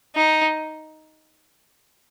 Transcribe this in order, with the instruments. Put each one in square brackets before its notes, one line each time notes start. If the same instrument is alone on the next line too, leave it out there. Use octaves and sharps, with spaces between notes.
[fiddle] D#4